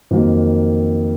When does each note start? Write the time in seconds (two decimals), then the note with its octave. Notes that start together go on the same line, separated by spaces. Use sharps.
0.11 F2 D#3 F#3 A#3